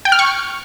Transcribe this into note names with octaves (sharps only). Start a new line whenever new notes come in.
G5
F6
C#6